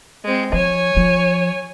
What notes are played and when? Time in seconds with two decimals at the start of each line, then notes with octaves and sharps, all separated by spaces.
0.24 G#3 C4
0.53 F3 C#5 G#5
0.97 F3